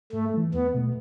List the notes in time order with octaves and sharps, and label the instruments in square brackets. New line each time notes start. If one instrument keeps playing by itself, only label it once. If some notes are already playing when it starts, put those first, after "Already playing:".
[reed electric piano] G#2 [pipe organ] A3
[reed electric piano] E3 A3
[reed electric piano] E2 [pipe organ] B3
[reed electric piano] B2 A3